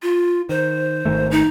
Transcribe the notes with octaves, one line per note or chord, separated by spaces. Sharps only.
F4
D#3 C5
G#1 D#3 A3
D#4